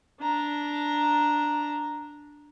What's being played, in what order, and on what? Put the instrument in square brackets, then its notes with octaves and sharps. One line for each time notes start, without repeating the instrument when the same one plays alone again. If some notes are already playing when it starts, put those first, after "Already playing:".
[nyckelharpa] D4 A#5